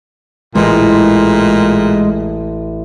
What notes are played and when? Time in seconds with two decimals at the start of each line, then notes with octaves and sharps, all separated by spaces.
0.55 A1 A#2 G#3